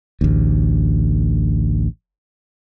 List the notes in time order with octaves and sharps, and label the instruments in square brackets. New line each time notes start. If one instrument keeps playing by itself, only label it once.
[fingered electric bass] A1 D2